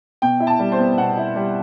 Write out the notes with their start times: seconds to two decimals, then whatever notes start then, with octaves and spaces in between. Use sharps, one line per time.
0.22 B2 G5
0.40 E4
0.47 A5
0.59 G3
0.72 C5
0.79 B3
0.98 B2 F#5
1.17 E4
1.35 G3